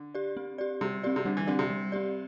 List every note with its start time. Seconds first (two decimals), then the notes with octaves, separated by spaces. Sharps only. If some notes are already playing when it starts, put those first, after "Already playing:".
Already playing: D3
0.15 G4 D5
0.37 C4
0.58 G4 D5
0.81 C3 G3
1.03 C4 G4 D5
1.16 C3
1.25 D3 G3
1.37 E3
1.47 D3 C4 G4 D5
1.59 C3
1.70 G3
1.92 C4 G4 D5